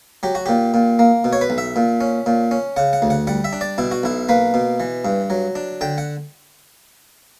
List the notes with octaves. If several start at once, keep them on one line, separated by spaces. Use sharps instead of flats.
F#3 G4
F#4
A#2 G4
A#2
A#3
B2
C#5
B4
B1
E5
A#2
C#4
A#2
C#4
C#3 F#5
F#5
D2
F#5
G3 F#5
E5
D4
D5
B2 E4
F#4
B1 E4
A#3 B4
B2
E3
G2
F#3
D4
D3 G5
F#5